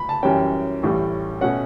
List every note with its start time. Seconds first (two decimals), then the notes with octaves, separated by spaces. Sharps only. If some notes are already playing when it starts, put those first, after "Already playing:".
Already playing: B5
0.09 A5
0.23 F#2 E3 G3 C#4 G5
0.83 A1 A2 G3
1.41 B2 A3 C#4 F#5